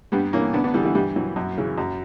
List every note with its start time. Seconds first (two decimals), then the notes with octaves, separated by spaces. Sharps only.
0.12 G2 G3 B3
0.33 E3 A#3 C#4
0.53 D2 B3 D4
0.64 B3 D4
0.74 D3 E3 G3
0.84 E3 G3
0.95 G2 E3 G3
1.16 E3 F#3
1.36 F#2
1.58 C#3 E3
1.78 F#2